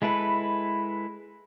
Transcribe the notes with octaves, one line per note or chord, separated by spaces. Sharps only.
G#3 E4 A4 B4